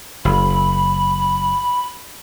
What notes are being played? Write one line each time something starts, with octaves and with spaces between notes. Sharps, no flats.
F#1 B5